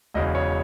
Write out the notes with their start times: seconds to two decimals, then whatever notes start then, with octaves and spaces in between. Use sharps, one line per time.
0.14 E1 E2 C#3 D#5
0.35 C#5